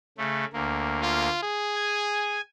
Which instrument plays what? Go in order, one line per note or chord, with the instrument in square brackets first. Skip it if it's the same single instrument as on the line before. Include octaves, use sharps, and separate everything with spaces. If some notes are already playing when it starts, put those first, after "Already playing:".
[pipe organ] C#3 A3
D2 A#3
[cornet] F4
G#4
[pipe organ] G#5